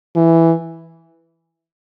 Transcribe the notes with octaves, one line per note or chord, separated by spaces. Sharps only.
E3